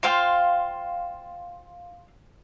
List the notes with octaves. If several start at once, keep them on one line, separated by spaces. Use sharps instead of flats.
F4 C5 F5 G5